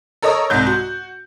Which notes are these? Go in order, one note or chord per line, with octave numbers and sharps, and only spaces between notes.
A4 A#4 C#5 D#5 A#5 D#6
C2 G#2 G6
F#4